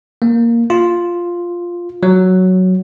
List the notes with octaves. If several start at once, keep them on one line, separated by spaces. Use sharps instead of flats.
A#3
F4
F#3